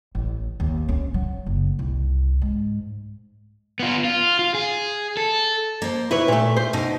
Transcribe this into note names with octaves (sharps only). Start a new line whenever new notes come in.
A1
D#2
C#4
F#3
F#1
C2
G#2
B3 F4
F4
F4
G#4
A4
A#3 C5
E4 B4 C#5 E5
A#2 A3
C5
B2 D#4